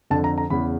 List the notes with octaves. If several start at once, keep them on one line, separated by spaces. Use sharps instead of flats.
F2 D3 A5
A#5
A#5
E2 C#3 E3 B5